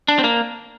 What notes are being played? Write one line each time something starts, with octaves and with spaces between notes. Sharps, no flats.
D4
C4
A#3